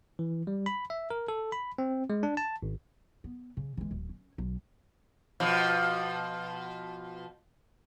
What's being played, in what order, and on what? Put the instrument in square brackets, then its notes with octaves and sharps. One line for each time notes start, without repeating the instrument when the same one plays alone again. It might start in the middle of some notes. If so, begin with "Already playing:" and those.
[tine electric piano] E3
G3
B5
E5
A#4
A4
B5
C4
G#3
D4
A5
G#1
[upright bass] B3
C#3
E3 G#3
D1
C#4
B1
[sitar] B2 F3